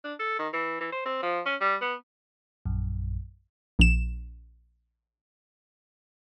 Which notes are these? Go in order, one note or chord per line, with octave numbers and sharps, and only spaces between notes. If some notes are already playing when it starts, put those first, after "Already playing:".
D4
A4
D#3
E3
E3
C5
C4
F3
C#4
G3
B3
A#1 F#2
A#1 E7